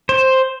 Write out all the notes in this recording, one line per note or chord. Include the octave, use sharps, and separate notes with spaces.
C5